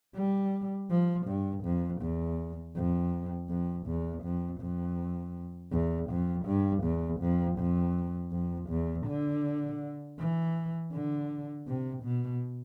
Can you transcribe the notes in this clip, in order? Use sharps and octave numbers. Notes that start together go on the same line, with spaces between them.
G3
F3
G2
F2
E2
F2
F2
E2
F2
F2
E2
F2
G2
E2
F2
F2
F2
E2
D3
E3
D3
C3
B2